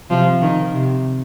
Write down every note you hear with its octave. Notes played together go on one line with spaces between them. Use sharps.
C3 F3
D#3
C3